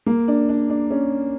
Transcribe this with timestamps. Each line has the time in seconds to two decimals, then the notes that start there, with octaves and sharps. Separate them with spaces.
0.06 A#3
0.28 D4
0.49 D4
0.70 D4
0.91 C#4